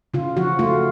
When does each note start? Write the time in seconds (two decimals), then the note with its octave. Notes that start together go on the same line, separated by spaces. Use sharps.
0.14 C#3 F4
0.37 F3 F#4
0.59 A3 F4